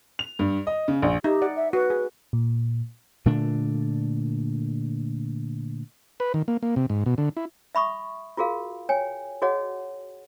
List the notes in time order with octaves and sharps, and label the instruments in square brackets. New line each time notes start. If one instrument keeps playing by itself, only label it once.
[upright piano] F7
G2
D#5
C#3
A#1
[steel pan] D#4 E5 [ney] G4
[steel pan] D5 F#5
[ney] E5
[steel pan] F#4 [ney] B4
[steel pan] G#4
[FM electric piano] A#2
[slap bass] A#2 D3 A3 D4
[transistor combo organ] B4
D#3
A#3
A#3
C3
G#2
B2
D3
E4
[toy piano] E5 B5 C#6 D#6
F4 F#4 G#4 A#4 F5
C#5 G5 G#5
F#4 G#4 C#5 D#5 F#5